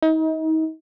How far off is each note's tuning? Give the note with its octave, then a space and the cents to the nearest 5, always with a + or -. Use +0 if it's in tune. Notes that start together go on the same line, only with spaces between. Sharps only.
D#4 +35